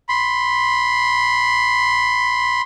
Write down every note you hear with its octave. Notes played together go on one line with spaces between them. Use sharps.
B5 C6